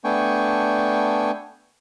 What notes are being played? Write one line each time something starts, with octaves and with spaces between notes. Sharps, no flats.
A3 B3 D4 G5 G#5 C#6